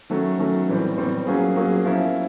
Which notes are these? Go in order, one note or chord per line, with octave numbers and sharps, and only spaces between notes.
D#3 F#3 A3 C#4
D#3 F#3 A3 C#4
A2 E3 G3 C4
A2 E3 G3 C4
F#3 A#3 C#4 F4 G#4
F#3 A#3 C#4 F4 G#4
F3 A#3 C#4 E4